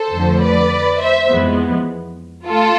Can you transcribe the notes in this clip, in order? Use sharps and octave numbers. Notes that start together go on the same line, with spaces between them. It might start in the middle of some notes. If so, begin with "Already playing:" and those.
Already playing: A4 C5
F2 D3 F3 A3
B4 D5
C5 E5
F2 E3 G#3 B3
A3 F4 A4